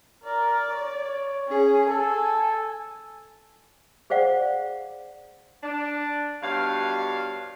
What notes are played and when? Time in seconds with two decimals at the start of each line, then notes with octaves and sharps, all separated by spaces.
0.24 A#4 D5
0.69 C#5
1.47 C#4 G#4
1.89 A4 G#5
4.10 G#4 C5 D5 F5 F#5
5.63 D4
6.43 G2 B2 C#5 F5